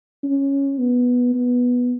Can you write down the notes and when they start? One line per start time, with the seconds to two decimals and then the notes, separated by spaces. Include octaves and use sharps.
0.23 C#4
0.79 B3
1.34 B3